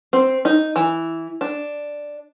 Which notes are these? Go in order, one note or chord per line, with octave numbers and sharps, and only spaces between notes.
C4
D#4
E3
D4